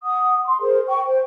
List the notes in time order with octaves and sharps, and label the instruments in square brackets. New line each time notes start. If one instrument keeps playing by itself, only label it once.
[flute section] F#5 D#6
C6
G#4 A#4 C5
G5 C#6
C5 G5